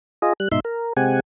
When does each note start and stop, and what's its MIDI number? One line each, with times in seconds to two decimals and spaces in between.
0.22 0.33 65
0.22 0.33 68
0.22 0.33 75
0.40 0.48 55
0.40 0.48 90
0.52 0.60 44
0.52 0.60 47
0.52 0.60 63
0.52 0.60 76
0.52 0.60 84
0.65 0.93 70
0.97 1.20 48
0.97 1.20 56
0.97 1.20 60
0.97 1.20 67
0.97 1.20 78
0.97 1.20 80